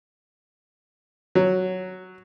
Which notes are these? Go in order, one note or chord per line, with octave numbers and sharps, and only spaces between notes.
F#3